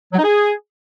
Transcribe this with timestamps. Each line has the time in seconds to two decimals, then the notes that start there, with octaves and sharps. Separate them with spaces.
0.12 F#3
0.18 D#4
0.23 G#4